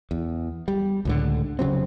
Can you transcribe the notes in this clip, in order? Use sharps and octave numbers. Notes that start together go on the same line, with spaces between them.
E2
G3
C#2 A2 D3
F1 C#3 F#3 C4